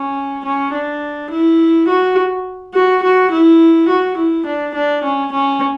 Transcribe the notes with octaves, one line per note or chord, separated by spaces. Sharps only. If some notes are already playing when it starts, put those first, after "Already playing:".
Already playing: C#4
C#4
D4
E4
F#4
F#4
F#4
E4
F#4
E4
D4
D4
C#4
C#4